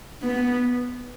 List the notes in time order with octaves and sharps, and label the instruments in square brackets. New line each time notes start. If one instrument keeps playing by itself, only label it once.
[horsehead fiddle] B3